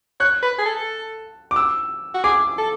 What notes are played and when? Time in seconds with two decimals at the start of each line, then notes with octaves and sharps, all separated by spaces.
0.20 C#5 F#6
0.42 B4
0.58 G#4
0.66 A4
1.51 D6
1.56 E6
2.14 F#4
2.24 G#4 D6
2.58 A4